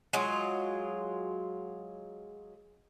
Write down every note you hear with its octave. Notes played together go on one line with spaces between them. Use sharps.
F#3 G#3 F4